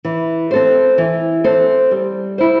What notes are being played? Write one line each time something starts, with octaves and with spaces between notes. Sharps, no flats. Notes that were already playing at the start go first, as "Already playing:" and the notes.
E3
C4 A4 C5
E3
C4 A4 C5
G3
E4 C5